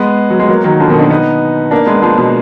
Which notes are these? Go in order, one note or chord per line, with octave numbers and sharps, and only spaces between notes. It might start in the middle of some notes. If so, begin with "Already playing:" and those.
Already playing: G#3 B3
F#3
G#3
F#3 A#3
D#3 F#3
D3 F3
B2 D#3
A#3 D4
B3 D#4
A#3 D4
G#3 B3
F3 G#3
B2